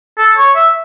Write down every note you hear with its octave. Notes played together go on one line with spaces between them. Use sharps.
A4
C#5
E5